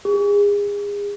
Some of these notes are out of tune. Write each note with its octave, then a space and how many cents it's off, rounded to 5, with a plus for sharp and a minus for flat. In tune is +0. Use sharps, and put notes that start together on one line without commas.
G#4 -30